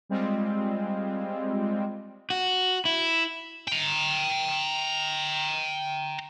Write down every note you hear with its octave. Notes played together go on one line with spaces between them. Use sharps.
G3 G#3 C4 F4
F#4
E4
G5 A#5